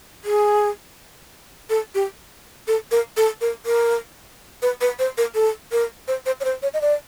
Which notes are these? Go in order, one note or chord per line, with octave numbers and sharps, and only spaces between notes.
G#4
A4
G4
A4
A#4
A4
A#4
A#4
B4
B4
C5
A#4
A4
A#4
C5
C5
C#5
C5
C#5
D#5
D5